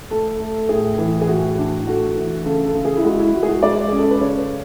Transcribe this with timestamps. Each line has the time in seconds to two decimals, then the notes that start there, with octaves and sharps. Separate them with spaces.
0.10 A3 A4
0.40 A3
0.69 A2 G#4
0.98 E3
1.21 G#4
1.27 A2 F#4
1.58 D4
1.86 A3 F#4
2.16 E3
2.45 C#3 A4
2.65 A4
2.75 C#3
2.85 G#4
2.97 E4
3.04 G#3 F#4
3.19 E4
3.34 G#3 F#4
3.43 G#4
3.48 F#4
3.63 G#3 D5
3.88 C#4 G#4
3.99 A4
4.11 B4
4.21 C#3 C#5